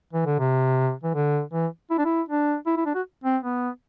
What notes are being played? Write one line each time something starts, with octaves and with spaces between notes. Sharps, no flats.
E3
D3
C3
E3
D3
E3
E4
D4
E4
D4
E4
E4
D4
F#4
C4
B3